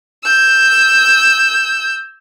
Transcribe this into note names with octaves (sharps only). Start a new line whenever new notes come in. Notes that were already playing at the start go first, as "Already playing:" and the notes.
E6 G6